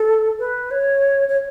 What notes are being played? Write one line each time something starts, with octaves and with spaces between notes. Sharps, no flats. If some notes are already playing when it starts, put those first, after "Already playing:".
Already playing: A4
B4
C#5
C#5